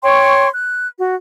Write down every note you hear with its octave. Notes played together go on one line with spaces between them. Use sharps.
C#5 G5 C6 C#6
F#6
F#4